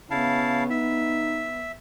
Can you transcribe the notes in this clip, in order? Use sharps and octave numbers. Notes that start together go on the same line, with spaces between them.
C#3 B3 E4 F5 A5
D#4 E5